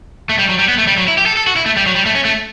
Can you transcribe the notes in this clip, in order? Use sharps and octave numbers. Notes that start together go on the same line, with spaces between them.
A3
G3
F#3
G3
B3
A3
G3
F#3
E4
G4
A4
A4
F#4
E4
A3
G3
F#3
G3
A3
C#4
A3